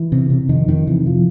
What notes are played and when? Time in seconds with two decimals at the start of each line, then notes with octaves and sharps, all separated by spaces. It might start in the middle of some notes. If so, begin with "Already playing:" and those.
Already playing: E3
0.12 C3
0.30 C3
0.49 F2 D#3
0.68 F2 D#3
0.87 C3 E3
1.07 F3